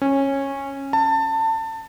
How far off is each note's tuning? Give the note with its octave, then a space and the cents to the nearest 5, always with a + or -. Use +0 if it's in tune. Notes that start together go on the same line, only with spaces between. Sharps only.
C#4 -15
A5 +25